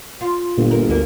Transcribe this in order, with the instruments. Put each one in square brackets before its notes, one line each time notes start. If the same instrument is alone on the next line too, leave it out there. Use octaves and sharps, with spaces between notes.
[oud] F4
[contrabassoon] G1 [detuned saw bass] A#2
[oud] A#4
[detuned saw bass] D2 [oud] G#2 A#3